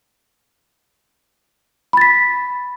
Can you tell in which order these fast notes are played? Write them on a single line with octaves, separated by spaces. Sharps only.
B5 A6 B6